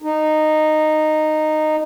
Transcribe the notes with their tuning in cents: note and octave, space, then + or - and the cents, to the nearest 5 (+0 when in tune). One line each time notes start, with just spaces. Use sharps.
D#4 -10